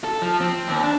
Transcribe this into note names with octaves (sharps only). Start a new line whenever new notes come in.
A4
F3
C4
D#2
D4